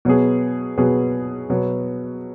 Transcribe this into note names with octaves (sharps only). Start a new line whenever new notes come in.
B2 F#3 B3 G#4
B2 F#3 B3 G#4
B2 F#3 B3